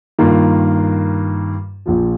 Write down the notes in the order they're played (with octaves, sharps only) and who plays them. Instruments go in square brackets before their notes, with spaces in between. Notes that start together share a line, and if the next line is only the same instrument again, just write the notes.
[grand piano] G2 D#3 A#3 F4
A#1 A#2 F3